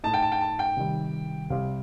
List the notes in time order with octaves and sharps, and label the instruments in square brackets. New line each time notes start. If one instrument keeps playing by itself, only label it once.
[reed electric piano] A2 A3 D#4 [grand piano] A5
[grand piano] G5
A5
G5
A5
G5
[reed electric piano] C3 D#3 G3
[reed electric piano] C2 C3 G3 C4 [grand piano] F5